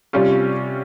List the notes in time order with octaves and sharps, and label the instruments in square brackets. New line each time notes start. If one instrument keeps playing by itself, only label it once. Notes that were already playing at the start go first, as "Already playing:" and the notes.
[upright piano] C3 G3 C#4 F4